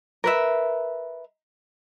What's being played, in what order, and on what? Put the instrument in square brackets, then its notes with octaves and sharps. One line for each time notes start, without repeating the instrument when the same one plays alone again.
[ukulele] A#4 B4 E5